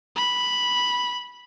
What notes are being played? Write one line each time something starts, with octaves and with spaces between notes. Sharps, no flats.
B5